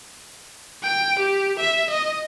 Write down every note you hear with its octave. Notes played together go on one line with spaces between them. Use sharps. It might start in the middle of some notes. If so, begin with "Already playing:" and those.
G5
G4
E5
D#5